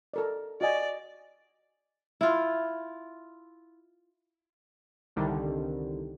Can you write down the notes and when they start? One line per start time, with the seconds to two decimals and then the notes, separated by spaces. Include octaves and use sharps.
0.14 A4 A#4 D5
0.61 F#4 D5 D#5 G#5
2.21 E4 F4
5.16 C2 D3 D#3 G3